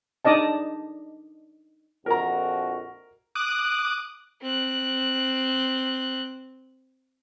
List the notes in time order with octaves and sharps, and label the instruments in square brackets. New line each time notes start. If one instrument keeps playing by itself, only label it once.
[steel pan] D4 D#4 D5 D#5 A5
[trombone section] A#1 F2 F#4 [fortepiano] A#4 A#5
[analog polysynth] D6 D#6 F#6
[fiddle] C4 F#6